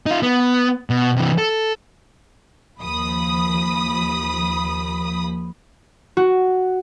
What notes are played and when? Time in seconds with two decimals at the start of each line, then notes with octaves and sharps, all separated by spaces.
0.06 D#4 F4
0.23 B3
0.90 B2
1.17 C3 E3
1.38 A4
2.78 D#2 F3 B5 D#6
6.17 F#4